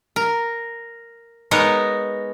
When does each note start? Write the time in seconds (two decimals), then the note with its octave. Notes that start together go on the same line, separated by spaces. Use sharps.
0.16 A#4
1.51 G#3 B3 D#4 A#4 C#5